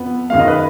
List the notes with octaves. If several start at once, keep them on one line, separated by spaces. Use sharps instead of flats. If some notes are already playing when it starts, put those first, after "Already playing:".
Already playing: F2 F3 B3
F#2 D#3 G#3 F5
D#5
B4